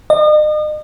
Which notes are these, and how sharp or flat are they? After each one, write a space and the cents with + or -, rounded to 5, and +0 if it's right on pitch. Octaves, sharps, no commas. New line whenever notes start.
D#5 -40